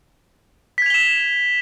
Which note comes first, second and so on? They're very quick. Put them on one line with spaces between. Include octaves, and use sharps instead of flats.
B6 G#6 F7 G7 E7